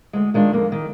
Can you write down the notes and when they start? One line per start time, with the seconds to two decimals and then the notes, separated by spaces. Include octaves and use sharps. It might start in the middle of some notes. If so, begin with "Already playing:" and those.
0.13 D2 G#3
0.34 D#3 G#3 D4 F4
0.52 F2 A#3
0.72 D#3